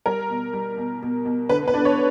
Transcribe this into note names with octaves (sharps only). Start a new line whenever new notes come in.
G3 A#4
B2
G3
B2
B2
B2
D3 B4
B4
D4
C#5